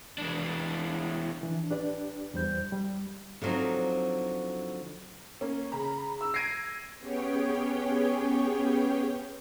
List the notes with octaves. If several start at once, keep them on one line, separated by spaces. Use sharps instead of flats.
E2 D4
E3 D4
D4 G4 B4 D5
E2 G3 C5 G6
G3
D3 F3 F#3 C4 D#4
A#3 C#4
C#3 A#5 B5
E6
G#6 A#6 C7 D7 D#7
B3 C#4 G4 G#4 C#5 G5